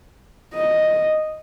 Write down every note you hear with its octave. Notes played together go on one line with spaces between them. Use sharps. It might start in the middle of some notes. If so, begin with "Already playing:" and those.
D#5